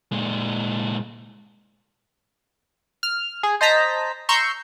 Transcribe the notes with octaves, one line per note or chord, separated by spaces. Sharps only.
A#2 G#3
F6
G#4
C5 D#5 A5 A#5 B6
A#5 C6 C#6 E6 G6